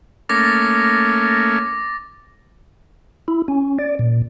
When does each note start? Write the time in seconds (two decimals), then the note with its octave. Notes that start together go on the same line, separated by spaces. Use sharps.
0.29 A3 A#3 C#4 D6 A6 A#6
3.28 E4
3.48 C#4
3.79 D5
3.99 A#2